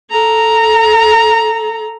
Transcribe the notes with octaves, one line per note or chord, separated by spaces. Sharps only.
A4 A#5